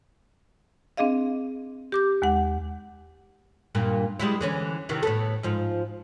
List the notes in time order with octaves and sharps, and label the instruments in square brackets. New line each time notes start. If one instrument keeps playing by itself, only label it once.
[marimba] C4 D4 G#4 D#5 F5
G4 D6 G6
D#2 G#3 F#5
[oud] G2 A#2 A#3
G3 G#3 E4
D3 E3 C#4
C3 D#3 E3
A2 B3 A4
G#2 F3